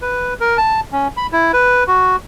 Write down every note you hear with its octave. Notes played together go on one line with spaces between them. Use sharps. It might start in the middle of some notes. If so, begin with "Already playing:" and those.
B4
A#4
A5
C#4
B5
E4
B4
F#4